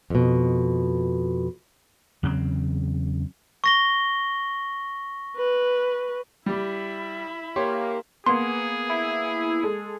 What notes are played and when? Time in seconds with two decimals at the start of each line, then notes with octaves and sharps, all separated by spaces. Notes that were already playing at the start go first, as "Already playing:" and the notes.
0.10 F2 B2
2.23 E2 C#3 F#3 C4
3.64 C#6 A#6 G7
5.37 B4
6.46 G3 E4 G4 E5 B5
7.56 A#3 G4 C#5 C6
8.26 A#3 B3 G#4 C6
8.90 E4
9.63 G#3 A4